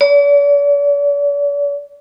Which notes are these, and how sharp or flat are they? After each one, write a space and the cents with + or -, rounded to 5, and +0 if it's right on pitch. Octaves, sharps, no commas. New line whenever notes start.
D5 -45